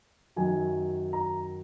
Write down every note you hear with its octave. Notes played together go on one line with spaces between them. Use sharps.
F#2 D#3 F#3 G#5
A#5